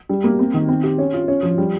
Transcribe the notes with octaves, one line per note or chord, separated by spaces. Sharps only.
G3
A#3
C4
D#3
C4
G4
C#4
F4
C#4
F3
G3